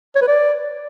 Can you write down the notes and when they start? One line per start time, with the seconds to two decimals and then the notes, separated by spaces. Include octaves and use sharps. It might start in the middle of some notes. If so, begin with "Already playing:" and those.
0.15 C#5
0.21 B4
0.28 D5